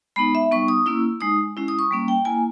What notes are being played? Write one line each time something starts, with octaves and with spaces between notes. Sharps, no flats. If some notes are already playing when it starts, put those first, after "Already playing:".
G#3 B3 D#4 B5
E5
G3 B3 D#4 C#6
D#6
A#3 C#4 E4 E6
G#3 D#4 D#6
G#3 C#4 E4
D#6
C#6
G3 A#3 C#4
G5
A#3 E4 G#5